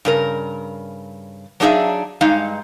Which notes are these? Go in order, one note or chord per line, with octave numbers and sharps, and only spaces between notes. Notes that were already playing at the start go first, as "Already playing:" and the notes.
G2 C#3 A#4
F#3 D4 D#4 G#4 E5 F5
G2 G#3 D#4 F5